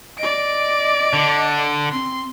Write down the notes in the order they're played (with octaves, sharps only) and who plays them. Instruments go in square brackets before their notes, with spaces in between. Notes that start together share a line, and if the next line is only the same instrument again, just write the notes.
[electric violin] D5 D7 [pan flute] D#5
[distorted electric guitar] D3
[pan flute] C4 [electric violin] C6